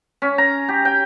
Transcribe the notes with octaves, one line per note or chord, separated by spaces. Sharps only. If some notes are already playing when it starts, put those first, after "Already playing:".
C#4
A#5
G4
G5